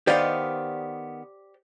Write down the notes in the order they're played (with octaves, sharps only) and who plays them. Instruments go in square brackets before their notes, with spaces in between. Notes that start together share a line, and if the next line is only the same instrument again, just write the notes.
[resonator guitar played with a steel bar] D#3 B3 F5 [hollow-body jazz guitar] G4 C5 D5